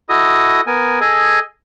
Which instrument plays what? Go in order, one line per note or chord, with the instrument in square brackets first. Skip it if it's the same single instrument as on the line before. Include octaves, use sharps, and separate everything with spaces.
[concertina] E4 F#4 A4 D#5 D#6
B3 A#4 G#5
G#4 A4 D#5 G#5